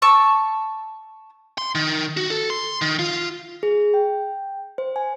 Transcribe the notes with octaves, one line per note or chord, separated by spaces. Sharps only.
A5 C#6 D6 E6
C6
D#3
F#4
A4
C6
D#3
F4
G#4
G5
C5
G#5